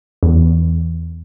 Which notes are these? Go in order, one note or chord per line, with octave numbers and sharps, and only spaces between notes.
E2